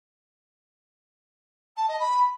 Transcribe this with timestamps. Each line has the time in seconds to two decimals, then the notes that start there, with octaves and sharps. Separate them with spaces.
1.76 A5
1.88 D#5
1.99 B5